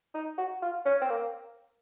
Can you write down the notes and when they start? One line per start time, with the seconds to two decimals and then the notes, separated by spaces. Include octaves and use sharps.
0.14 D#4
0.38 F#4
0.62 F4
0.85 C#4
1.01 C4
1.09 A#3